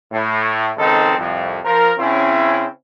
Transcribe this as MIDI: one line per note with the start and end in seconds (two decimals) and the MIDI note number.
0.12 0.70 45
0.77 1.16 37
0.77 1.16 51
0.77 1.16 60
0.77 1.16 63
0.77 1.16 69
1.17 1.58 36
1.17 1.58 41
1.64 1.91 53
1.64 1.91 70
1.99 2.65 49
1.99 2.65 60
1.99 2.65 61
1.99 2.65 64